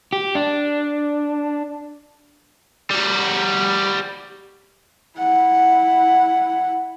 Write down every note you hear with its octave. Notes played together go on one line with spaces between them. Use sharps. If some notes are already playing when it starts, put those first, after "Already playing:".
G4
D4
G3 F#4
E4 F#5